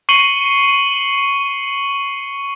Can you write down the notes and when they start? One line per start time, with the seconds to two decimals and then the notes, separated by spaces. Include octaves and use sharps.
0.09 C#6 C7 C#7 D#7 F#7 G7